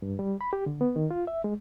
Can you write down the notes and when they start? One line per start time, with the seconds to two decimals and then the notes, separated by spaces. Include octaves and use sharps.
0.02 G2
0.19 G3
0.41 B5
0.53 G4
0.66 D3
0.81 B3
0.96 D#3
1.11 F4
1.27 E5
1.44 G#3